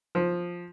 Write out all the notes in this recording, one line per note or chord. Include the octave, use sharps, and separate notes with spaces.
F3